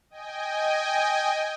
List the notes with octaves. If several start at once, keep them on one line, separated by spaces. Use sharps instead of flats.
D#5 G5 G#5